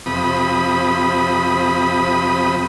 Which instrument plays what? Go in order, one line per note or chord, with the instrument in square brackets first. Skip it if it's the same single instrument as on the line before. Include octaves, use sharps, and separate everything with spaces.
[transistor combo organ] F2 C3 B5 D#6